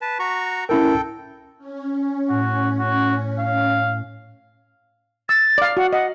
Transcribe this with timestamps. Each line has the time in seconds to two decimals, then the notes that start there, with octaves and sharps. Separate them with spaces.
0.01 B4 A5
0.19 F#4 A#5 C#6
0.69 C#4 E4 A4 A#4 G5
1.58 C#4
2.30 A2 F#4
2.79 F#4
3.39 F5
5.29 E6 A6
5.58 D5 F5
5.77 F#4 F#5
5.93 D#5 F#5